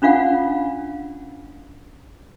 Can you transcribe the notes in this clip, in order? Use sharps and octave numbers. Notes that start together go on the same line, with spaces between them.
C#4 D4 F4 F5 F#5